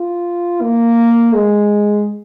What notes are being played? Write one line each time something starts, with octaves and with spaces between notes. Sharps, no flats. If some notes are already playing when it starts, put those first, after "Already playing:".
Already playing: F4
A#3
G#3